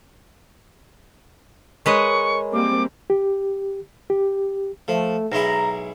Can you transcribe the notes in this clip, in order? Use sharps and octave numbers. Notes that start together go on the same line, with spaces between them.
G#3 A#4 B4 C#5 D#5 C#6
G3 A#3 C4 D6
G4
G4
F3 A3
B1 G#3 E4 A#5